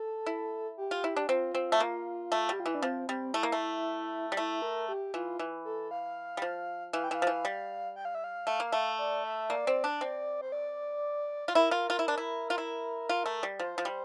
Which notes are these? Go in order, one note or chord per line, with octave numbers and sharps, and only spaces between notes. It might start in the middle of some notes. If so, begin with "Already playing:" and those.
Already playing: A4
E4
G4
F4
E4
D4
C4 F4
C4
A3
A#3 F4
A3
G3 G4
F4
E3 E4
D4
F3 C4
G3 C4
A3 E4
A#3
A3
G3
A3 E4
A#4
G4
E3 F4
E3
A4
F5
G3
F3
E3 F5
G5
E3 F5
F3
E3
G3
G5
F5
E5
F5
A3
A#3
A3
D5
E5
A#3 D5
C4
D4
C4
C5
D5
F4
E4 A#4
F4
F4
E4
D4
E4
F4
E4
F4
A3
G3
F3 C5
F3
G3